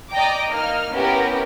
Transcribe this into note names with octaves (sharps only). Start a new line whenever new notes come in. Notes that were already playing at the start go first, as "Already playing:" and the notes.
D5 D#5 G5 A#5 D6
A#3 D#4 F6
B3 C#4 E4 G4 A#4